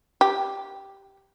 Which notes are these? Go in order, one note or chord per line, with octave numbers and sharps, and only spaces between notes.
G4